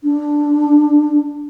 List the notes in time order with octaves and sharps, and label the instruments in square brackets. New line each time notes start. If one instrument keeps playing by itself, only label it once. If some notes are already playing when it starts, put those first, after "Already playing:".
[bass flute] D4